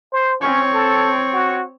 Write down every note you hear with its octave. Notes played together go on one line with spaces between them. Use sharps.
C5
C4 C#4 C#5
A4
F#4